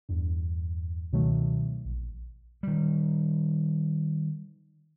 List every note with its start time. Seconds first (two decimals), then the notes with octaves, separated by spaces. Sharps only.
0.09 E2 G2
1.12 C#2 B2 D#3 F#3 A3
1.85 A#1
2.63 D#3 G3